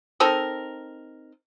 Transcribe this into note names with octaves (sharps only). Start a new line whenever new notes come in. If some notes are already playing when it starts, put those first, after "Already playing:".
C4 D#4 A4 A#4